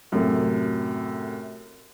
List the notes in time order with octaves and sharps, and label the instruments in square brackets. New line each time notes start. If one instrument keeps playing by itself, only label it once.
[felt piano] F#2 A2 C3